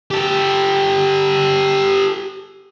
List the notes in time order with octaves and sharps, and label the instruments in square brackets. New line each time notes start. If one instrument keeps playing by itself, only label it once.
[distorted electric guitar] G4 A4